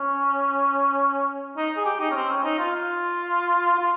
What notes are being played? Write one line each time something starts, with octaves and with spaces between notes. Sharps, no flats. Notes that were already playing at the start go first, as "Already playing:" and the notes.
Already playing: C#4
D#4
G#4
G4
D#4
C#4
C4
C#4
D#4
F4
F4
F4